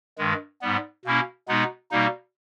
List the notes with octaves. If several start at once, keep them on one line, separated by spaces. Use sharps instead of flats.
G2 D#3 G#3
G#2 G3 B3
B2 A#3 C#4 E4
B2 G#3 B3 D#4
B2 G3 A#3 D#4